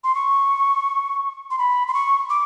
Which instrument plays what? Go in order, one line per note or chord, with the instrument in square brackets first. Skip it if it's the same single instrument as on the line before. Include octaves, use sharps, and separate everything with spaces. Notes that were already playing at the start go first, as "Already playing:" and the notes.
[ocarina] C6
C#6
C6
B5
C6
C#6
D6